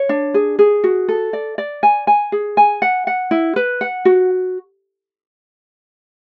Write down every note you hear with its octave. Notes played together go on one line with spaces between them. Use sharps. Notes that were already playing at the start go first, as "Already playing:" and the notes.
Already playing: C#5
D4
G#4
G#4
F#4
A4
D5
D5
G#5
G#5
G#4
G#5
F#5
F#5
E4
B4
F#5
F#4